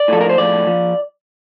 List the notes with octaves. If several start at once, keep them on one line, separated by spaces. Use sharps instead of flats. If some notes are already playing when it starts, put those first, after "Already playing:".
Already playing: D5
A2 F3 A4
A#4
C5
A2 F3 D5
F3